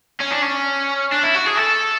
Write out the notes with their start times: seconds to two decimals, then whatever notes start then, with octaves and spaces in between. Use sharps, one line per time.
0.21 C#4
0.32 D4
0.43 C#4
1.12 D4
1.24 E4
1.35 F#4
1.46 G#4
1.57 A4